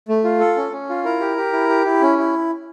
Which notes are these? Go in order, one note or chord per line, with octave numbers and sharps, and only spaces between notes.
A3
F4
A4
C#4
C#4
F4
E4 A#4 A#5
G4
G4
E4
G4
E4
C#4
E4